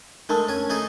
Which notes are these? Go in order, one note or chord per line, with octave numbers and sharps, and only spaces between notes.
G#3 A3 D4 A#4 A5
C#4 G#5
A3 D#4 G#4